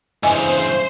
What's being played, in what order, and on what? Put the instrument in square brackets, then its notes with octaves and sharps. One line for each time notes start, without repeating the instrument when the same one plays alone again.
[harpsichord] E2 [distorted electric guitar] G2 C#3 [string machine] C5 [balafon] D#5 G#5